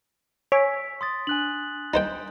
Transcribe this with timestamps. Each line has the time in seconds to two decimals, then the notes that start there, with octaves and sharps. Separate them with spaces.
0.52 C#5 G#5 E6 B6 D7
1.01 C6 D#6 A6
1.27 D4 G#5 F#6 F#7
1.94 D#4 C5 G5